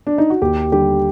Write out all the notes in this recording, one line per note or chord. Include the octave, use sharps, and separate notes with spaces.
D4
D#4
F#4
D#2 G4
D3 G3 G4